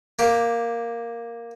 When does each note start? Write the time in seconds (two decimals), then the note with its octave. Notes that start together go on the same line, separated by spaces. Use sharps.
0.19 A#3 G4